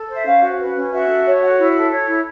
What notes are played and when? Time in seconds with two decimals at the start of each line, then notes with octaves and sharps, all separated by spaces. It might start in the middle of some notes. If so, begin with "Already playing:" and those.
Already playing: A4
0.10 C5 E5
0.26 C#4 F5
0.43 F#4
0.59 B4
0.76 C#4
0.92 F#4 E5
1.08 A4
1.24 C#5
1.41 F#4
1.58 E4
1.75 A4
1.91 C#5
2.07 E4